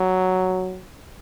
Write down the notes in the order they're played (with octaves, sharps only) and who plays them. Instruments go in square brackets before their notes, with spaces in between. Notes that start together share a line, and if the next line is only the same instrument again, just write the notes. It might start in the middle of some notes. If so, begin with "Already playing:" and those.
Already playing: [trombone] F#3